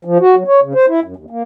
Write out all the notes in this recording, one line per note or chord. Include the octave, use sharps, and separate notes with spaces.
F3
F#4
F#3
C#5
C#3
C5
E4
F#2
D#2
A#3